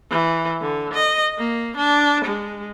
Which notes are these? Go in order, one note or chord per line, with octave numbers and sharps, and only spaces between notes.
E3
D3
D#5
A#3
D4
G#3